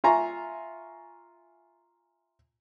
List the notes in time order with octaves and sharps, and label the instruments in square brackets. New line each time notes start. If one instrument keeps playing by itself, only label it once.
[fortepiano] F4 E5 G#5 A#5 C#6